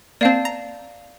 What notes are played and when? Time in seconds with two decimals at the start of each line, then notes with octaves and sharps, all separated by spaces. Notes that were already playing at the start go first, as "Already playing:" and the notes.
0.21 A#3 C4 D5 F5 A5
0.45 A#5